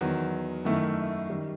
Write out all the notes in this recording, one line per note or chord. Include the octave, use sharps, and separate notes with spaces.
E2 D#3 F#3
F#2 D#3 A3 E4
D#3 G3